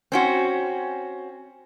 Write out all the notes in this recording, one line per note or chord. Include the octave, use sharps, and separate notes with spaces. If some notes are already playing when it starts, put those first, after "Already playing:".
C4 C#4 F#4